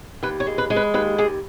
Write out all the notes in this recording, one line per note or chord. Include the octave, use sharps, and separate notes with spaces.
D#2 B4
C#5
G#3
B4
G#3
B4
D#2 B4
D#2 G#4